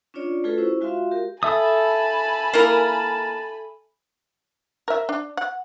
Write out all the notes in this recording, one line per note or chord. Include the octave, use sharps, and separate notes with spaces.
C#4 D4 F4 C#5 D5
A3 F4 F#4 G#4 A4 B4
C#4 E4 C5
G#3 F4 F#4 E5 F5 C6
G4 A#4
A4 E5 G#5 A5 B5 D#6
A#3 E4 A#4
A#4 E5
D4
F#5